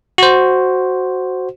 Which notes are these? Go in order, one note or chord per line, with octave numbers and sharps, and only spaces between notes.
F#4 C5